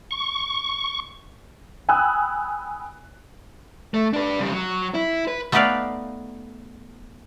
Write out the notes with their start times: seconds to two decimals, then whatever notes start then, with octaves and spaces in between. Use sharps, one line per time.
0.11 C#6
1.89 G5 G#5 B5 D#6 E6 F#6
3.94 A3
4.13 D4 B4
4.39 C#3 G3
4.53 F#3
4.94 E4
5.28 B4
5.52 A3 B3 D#4 B4 D5 F5